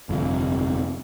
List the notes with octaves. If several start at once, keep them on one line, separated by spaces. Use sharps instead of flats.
G1 F2 C3 F3